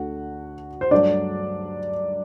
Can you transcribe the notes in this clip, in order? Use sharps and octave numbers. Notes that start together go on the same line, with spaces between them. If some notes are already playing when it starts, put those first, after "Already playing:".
Already playing: D2 D3 A3 F#4 F#5
C5
G2 F#3 A3 D4 D5